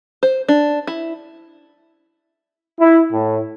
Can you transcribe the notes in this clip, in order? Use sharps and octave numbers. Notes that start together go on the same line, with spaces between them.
C5
D4
E4
E4
A2